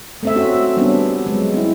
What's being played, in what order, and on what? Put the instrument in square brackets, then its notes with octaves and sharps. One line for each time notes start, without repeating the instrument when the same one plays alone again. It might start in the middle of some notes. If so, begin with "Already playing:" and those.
[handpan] A3 C4 E5
C4 C#4 F#4
G3 B3 C#4 D4
F#3 G#3
C4 E4